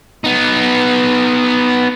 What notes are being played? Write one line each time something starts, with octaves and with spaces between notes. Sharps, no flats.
B3 D#4